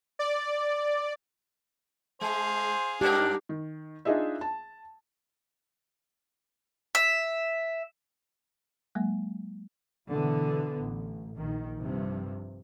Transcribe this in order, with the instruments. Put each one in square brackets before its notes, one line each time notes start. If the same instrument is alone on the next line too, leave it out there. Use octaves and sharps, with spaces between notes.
[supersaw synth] D5
[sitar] G#3 [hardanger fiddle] G#4 F5 [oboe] C5
[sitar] G2 D#4 A#4 [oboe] D4 [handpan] G4
[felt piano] D#3
D4 D#4 F4 G#4 D#5 E5
A5
[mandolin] E5
[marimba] F#3 G#3 A#3
[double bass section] B2 D3 E3 B3
A1
A#1 D#3
G2 C3 F3